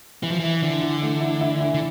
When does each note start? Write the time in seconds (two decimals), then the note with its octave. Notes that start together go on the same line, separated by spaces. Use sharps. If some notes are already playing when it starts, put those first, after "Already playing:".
0.23 E3 E4
0.31 F3
0.39 E3 E4
0.62 D3 E3
0.82 E3
1.02 A3
1.21 E4
1.41 E4
1.60 E3
1.74 D3